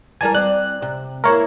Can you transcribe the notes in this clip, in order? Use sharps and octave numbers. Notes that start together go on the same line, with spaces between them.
E3 G3 A#4 G#5 A5
C4 D5 F#6
C3
A#3 E4 A#4 C5 C#5